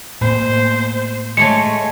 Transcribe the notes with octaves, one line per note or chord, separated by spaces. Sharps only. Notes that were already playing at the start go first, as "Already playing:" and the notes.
A2 A#3 B3 C5
G#3 A3 C#5 G#5 C#7